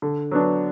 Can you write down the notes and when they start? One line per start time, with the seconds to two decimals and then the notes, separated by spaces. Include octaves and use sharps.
0.02 D3
0.31 F#3 B3 D4